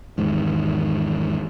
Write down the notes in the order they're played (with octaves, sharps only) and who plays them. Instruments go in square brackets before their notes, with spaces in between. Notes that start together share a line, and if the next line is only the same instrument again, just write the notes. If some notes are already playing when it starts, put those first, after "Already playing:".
[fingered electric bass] E2 G#2 D#3